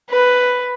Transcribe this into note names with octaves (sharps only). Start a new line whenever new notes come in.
B4